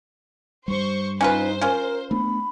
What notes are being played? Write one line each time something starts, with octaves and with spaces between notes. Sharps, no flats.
G2 G3 C5 C#6
C#4 D#4 F4 B4 C5
C#4 F4 A#4
A3 B3 D4 B5